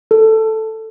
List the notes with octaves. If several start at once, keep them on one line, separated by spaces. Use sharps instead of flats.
A4